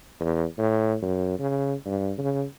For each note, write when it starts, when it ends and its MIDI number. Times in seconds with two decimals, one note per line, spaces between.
0.20 0.45 40
0.58 0.96 45
1.02 1.34 42
1.39 1.74 49
1.86 2.13 43
2.18 2.43 49